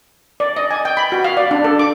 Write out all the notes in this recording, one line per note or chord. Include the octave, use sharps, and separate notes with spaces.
D5
D#5
G#5
G5
B5
F#4
F5
D5
D4
A4
D6